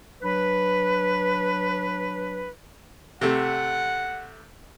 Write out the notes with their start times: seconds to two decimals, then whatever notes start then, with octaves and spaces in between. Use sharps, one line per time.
0.22 F#3 D4 B4
3.21 C3 A3 F#5